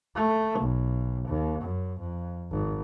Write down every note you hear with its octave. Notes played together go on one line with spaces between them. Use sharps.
A3
B1
D#2
F#2
F2
G#1